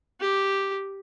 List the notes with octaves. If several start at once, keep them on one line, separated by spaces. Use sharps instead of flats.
G4